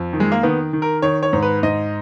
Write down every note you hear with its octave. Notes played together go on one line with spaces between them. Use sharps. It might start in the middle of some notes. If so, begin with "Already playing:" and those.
Already playing: F2
D#3
G#3
A#3
D#3 B3
D#3
A#4
D#3 C#5
C#5
G#2
B4
G#2 D#5